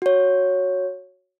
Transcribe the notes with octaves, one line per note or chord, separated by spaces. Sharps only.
F#4 C#5